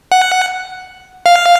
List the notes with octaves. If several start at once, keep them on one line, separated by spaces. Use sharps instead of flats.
F#5
F5